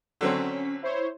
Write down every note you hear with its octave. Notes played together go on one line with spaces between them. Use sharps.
D3 F#3 C4 C#4 B6
E4 C5 C#5